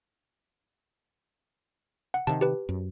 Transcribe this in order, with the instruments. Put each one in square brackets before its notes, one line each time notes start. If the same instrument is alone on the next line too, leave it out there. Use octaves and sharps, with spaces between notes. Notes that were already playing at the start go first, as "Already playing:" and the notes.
[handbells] F#5
[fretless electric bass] C3 D#3 [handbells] A5
[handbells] G4 B4
[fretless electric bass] F#2